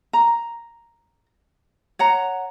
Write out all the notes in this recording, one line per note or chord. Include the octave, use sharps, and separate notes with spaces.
A#5
C#5 F#5 A#5